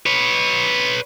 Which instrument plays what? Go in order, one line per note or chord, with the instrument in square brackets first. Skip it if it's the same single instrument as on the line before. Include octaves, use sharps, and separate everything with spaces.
[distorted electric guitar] B4 C#5